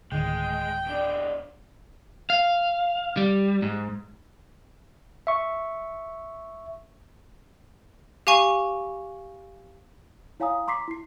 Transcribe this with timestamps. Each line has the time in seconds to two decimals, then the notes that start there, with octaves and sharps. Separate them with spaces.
0.12 D1 D2 D#3 G#3 G5
0.86 B2 D4
2.30 F5
3.17 G3
3.62 G#2
5.27 E5 C#6
8.27 G4 F5 G#5 C#6
10.40 E4 C#5 F5 G#5 A#5 D#6
10.67 A#5 C6 D6 B6 C7
10.88 E4 C7